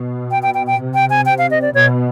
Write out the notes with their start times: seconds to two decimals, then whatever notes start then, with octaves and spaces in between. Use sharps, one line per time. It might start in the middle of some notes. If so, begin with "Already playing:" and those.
Already playing: B2
0.31 G5
0.43 G5
0.54 G5
0.67 G5
0.78 C3
0.94 G5
1.10 G#5
1.26 G5
1.38 F5
1.51 D#5
1.62 D5
1.74 B2 C#5